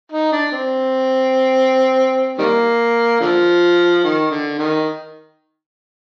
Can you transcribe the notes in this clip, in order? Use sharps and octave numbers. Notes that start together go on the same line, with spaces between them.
D#4
D4
C4
D#3 G3 A#3
D3 F3
D#3
D3
D#3